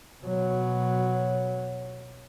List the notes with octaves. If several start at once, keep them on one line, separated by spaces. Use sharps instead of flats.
B2 F#3